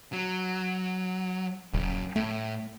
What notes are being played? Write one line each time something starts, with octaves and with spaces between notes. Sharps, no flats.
F#3
D#1 F#2 C#3
A2 A3